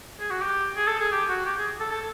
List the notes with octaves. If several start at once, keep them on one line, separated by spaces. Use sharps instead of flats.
G#4
F#4
G4
G#4
A4
G#4
G4
F#4
G4
G#4
A4
A4